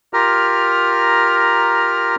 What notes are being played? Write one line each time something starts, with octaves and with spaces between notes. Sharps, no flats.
F4 G4 A#4 A#5 F6